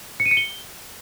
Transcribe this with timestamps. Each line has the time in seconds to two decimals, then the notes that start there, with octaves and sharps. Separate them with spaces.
0.20 C#7
0.26 D#7
0.31 C#7
0.37 G7